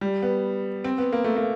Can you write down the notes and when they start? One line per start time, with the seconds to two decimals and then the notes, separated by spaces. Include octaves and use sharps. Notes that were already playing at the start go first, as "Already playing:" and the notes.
0.01 G3
0.22 B3
0.84 C4
0.98 B3
1.13 A#3
1.24 A3
1.36 A#3